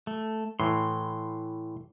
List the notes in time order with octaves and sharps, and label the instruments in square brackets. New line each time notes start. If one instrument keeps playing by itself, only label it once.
[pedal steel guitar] A3
[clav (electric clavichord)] A2 E3 [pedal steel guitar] C6